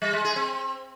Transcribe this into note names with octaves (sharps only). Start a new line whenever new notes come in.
G3
G#3
G#4
C4